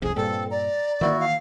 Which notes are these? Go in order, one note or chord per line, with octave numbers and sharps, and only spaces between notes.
F1 C2 F2 G#4
G2 A#2 C4 A4
D5 A#5
D#3 E3 A#3 E4 F#4
F5